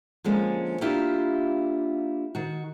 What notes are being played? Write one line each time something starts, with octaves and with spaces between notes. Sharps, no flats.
D3 F3 G#3 A#3 C#4
A#3 D4 E4 F4 G4
D#3 F#4